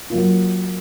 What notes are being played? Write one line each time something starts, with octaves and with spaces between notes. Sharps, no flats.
F#3 A#3 F4